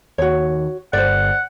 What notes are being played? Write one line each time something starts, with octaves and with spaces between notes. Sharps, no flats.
D#2 F#4 C#5
G1 C5 D5 F#5